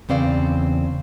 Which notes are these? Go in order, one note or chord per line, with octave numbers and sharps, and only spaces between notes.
E2 C#3 C4 D5 F5